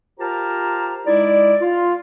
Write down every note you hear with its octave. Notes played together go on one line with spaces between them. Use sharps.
F4 G4 A#4 C5 A5 A#5
G#3 D#4 E4 D5
F4